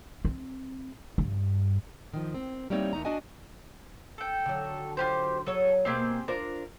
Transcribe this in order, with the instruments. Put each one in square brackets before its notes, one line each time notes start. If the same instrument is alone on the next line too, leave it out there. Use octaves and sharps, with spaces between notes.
[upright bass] C4
G2
[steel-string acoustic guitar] D#3 F3
C4
G3 A3 A#3 C4 D#4 C#5
D#2 A3 D#4 A#5
D4 F#4 D#5 G#5 A5
[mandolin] A4 G5
[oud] D3 F#3
[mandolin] F4 G4 C5
[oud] F#3 G#4 C#5 [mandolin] A4
[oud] B2 A#3 [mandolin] C4 G4 G#4
[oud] D4 F4 C5 [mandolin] A#4